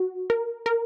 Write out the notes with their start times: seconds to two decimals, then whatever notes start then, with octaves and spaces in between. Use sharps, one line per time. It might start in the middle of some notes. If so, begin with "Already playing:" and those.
Already playing: F#4
0.30 A#4
0.66 A#4